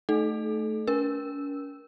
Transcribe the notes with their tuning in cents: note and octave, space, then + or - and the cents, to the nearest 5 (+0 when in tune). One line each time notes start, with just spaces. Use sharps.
A3 +0 D#4 +0 A4 -35
C#4 +40 A#4 +30